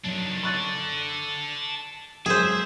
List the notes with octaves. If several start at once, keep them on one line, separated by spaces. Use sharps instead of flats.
F#2 D#3 D4
A4 D5 C#6 F#6 A6
F#2 G#3 G#4 C5 E5